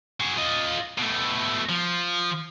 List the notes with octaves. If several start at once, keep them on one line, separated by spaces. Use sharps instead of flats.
F#4 G#4
F4 D#5
B2 A3
F3